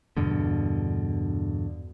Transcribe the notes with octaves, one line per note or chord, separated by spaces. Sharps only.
E2 G2 B2 D3